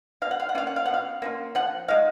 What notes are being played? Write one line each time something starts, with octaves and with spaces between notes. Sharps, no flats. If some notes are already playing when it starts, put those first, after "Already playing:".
B2 F5
F#5
F5
F#5
A#3 C#4 F4 F5
F#5
F5
B2 F#5
F5
A#3 C#4 F4
F3 F#5
G#3 D#4 F5